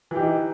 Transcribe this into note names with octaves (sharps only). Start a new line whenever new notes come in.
E3 D#4 G4